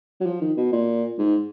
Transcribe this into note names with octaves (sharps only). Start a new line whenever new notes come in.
F#3
F3
D#3
B2
A#2
G#2